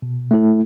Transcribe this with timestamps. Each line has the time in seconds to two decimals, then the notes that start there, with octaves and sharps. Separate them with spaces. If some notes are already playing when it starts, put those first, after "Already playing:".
0.02 B2
0.31 A3 E4 A4